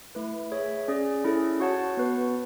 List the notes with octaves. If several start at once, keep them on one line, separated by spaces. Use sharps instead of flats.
A3 E4 B4
G#4 C#5 E5
C#4 G#4 D5
C#4 E4 A4
F#4 C#5 F#5 A5
B3 F#4 B4